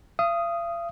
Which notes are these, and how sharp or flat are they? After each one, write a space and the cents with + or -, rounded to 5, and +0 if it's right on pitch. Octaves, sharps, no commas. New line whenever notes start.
F5 -40 D#6 +0